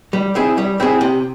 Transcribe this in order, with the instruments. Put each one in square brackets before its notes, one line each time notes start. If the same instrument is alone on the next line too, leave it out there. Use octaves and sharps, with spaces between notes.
[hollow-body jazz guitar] G3
C4 E4 G#4
G3
C4 E4 G#4
C3